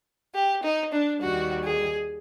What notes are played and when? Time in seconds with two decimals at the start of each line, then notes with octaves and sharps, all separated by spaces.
0.34 G4
0.62 D#4
0.91 D4
1.20 D#2 D#3 G3 F#4
1.64 G#4